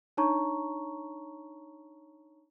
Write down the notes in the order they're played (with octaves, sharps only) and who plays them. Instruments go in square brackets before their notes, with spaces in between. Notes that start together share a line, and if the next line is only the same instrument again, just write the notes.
[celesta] D4 D#4 C#5 A5 A#5 C#6